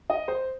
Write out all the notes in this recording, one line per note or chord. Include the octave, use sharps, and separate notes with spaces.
D#5
C5